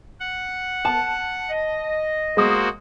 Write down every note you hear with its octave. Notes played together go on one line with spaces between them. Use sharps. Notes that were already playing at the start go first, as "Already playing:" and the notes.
F#5
A5
D#5
G#3 A#3 F#4 C5 D#6